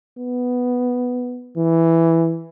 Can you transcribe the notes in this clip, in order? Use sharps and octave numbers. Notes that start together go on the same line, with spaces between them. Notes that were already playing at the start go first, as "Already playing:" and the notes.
B3
E3